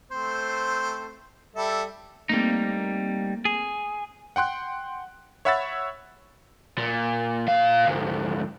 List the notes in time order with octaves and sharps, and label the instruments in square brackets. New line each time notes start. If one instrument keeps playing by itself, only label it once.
[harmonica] A3 C4 C5
G3 A4 E5
[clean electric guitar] G3 D#4 [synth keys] A3 A#3 C4
[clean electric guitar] G#4
[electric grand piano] F#5 G5 C6 F#6
C#5 E5 F#5 B5 E6 A6
[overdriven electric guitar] A#2
A#2 F5
D2 G#2